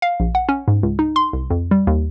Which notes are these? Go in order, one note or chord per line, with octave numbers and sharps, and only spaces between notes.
F5
A#1
F#5
C#4
G#2
C#2
D#4
C6
C2
F2
G3
D#2